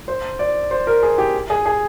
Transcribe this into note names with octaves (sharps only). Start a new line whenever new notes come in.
C5
D5
C5
A#4
G#4
G4
G#4
G#4